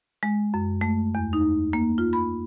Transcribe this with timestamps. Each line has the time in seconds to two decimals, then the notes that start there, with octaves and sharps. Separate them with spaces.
0.23 G#3
0.54 F#2
0.81 A3
1.15 E2
1.33 D#4
1.73 A#3
1.98 F4
2.13 B5